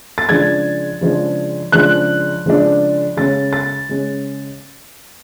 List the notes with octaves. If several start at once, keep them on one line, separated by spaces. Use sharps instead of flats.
A6
C#3 F3 G#3 D4 G#6
C#3 F3 G#3 D4
C#3 F3 G#3 D4 F#6
C#3 F3 G#3 D4
C#3 G#3 C#4 A6
A6
C#3 G#3 C#4